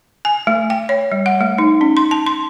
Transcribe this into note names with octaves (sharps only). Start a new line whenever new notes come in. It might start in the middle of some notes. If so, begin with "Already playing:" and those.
G#5
A3
G5
C#5
G3
F#5
A3
D#4
C#4
C6
A5
C6